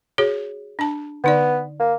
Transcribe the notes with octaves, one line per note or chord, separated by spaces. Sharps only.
F#4 G#4 C#5
D4 A5
D3 B3 D#4 D5
A#3